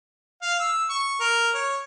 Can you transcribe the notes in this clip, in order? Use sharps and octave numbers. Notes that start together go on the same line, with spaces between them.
F5
E6
C#6
A#4
C#5